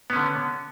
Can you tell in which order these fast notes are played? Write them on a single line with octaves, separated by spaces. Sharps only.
B3 C#4 D3